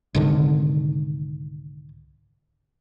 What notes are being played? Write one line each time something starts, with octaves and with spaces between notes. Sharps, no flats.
C2 G#2 D3 D#3